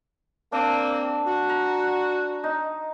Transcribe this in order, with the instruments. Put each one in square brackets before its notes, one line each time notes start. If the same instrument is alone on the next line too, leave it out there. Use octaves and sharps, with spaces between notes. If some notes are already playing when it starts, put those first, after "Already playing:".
[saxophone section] A#3 C4 [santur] D4
[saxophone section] F#4
[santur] A#5
D#4